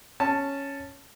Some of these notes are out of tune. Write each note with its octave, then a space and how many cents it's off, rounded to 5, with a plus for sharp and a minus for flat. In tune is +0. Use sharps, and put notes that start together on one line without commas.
C#4 +0 A5 +0